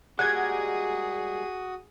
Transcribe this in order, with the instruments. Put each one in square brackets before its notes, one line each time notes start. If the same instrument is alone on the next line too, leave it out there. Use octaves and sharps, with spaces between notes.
[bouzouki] G3 G#3 A#3 [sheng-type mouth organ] F#4 D#6 [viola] G#4 [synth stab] F#5 G#6